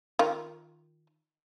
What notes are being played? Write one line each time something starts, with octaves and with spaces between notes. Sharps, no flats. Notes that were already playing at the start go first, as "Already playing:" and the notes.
D#3 F4